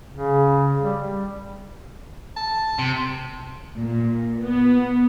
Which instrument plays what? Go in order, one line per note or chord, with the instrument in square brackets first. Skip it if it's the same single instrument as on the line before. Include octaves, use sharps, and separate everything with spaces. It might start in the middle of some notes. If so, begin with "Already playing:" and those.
[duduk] C#3
G3
[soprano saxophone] A5
[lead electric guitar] C3
[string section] A#2
B3